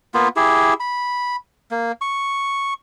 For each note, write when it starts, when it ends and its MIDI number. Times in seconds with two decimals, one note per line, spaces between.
0.14 0.28 58
0.14 0.28 59
0.14 0.28 65
0.36 0.74 64
0.36 0.74 67
0.36 0.74 68
0.80 1.36 83
1.71 1.92 58
2.01 2.74 85